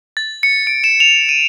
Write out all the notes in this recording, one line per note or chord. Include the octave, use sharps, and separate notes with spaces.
A6
C#7
D7
E7
F7
D#7